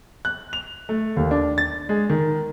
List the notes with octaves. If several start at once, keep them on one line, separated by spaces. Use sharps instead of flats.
F#6
F7
A3
D#2
D4
A6
G#3
D#3